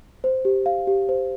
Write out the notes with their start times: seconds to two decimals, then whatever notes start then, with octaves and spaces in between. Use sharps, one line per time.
0.24 C5
0.45 G4
0.66 F5
0.87 G4
1.09 C5